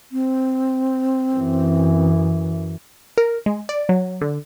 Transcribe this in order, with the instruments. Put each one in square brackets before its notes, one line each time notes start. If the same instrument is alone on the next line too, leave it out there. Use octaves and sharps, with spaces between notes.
[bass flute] C4
[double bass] F#2 E3
[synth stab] A#4
G#3
D5
F#3
D3